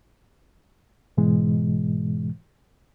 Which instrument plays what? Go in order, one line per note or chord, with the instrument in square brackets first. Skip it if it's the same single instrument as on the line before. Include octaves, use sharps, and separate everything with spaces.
[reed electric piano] G#2 B2 E3 G#3